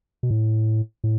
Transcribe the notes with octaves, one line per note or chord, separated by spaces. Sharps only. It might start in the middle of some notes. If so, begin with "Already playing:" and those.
B2
A2
A2